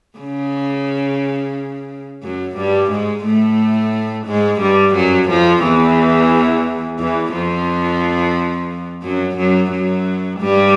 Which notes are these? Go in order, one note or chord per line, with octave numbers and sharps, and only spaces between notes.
C#3
F#2 F#3
G2 G3
G#2 G#3
A2 A3
G#2 G#3
G2 G3
F#2 F#3
F2 F3
E2 E3
E2 E3
F2 F3
F#2 F#3
F#2 F#3
F#2 F#3
G2 G3